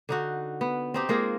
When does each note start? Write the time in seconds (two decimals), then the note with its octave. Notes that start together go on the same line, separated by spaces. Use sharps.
0.09 D3 D#4 F#4
0.61 B3
0.94 C4 D#4 G4
1.09 G#3 A#3 F4 G#4